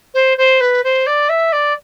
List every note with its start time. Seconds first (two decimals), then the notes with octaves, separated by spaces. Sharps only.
0.14 C5
0.38 C5
0.61 B4
0.84 C5
1.07 D5
1.29 E5
1.52 D5